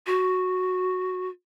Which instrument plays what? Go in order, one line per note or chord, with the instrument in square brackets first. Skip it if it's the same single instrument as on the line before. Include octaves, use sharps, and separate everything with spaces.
[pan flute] F#4